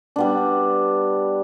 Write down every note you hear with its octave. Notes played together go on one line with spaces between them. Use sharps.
G3 B3 D4